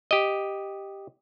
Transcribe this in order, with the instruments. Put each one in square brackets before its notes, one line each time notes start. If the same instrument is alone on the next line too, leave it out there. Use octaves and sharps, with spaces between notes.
[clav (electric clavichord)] G4 D#5